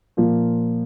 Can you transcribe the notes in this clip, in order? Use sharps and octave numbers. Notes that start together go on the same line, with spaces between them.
A#2 F3 A#3